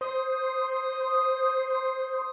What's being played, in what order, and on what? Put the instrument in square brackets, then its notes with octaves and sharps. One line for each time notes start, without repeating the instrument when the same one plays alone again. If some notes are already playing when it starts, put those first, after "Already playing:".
[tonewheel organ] C5 [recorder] D#6